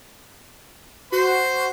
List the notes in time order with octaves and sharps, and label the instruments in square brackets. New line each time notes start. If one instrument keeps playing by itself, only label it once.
[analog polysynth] F#4 [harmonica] C5